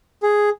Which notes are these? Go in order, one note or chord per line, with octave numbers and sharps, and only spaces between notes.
G#4